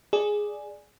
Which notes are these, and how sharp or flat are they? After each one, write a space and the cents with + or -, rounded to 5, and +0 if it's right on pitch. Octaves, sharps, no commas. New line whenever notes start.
G#4 +0 D5 +0